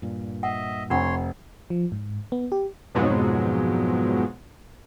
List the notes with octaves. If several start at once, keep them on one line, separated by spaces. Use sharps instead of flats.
G2 A#2
D#5 E5 F#5
F1 D4 F4 C#5 F#5 C6
F3
G#2
B3
G4
F2 G#2 B2 F3 F#3 G#3